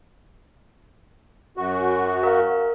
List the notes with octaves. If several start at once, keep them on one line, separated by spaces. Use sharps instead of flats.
F#2 F#4
A#4 F5